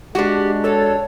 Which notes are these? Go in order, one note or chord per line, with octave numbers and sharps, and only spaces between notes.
G#3 D4 F#4 G4
A4 C#5